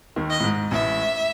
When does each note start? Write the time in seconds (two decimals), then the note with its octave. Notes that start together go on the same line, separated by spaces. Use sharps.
0.16 D#2 D#3
0.30 D#5
0.40 A2
0.44 G#2
0.71 A1 A2 E5